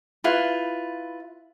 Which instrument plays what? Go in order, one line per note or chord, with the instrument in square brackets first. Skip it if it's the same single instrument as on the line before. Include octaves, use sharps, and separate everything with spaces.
[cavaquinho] E4 F4 B4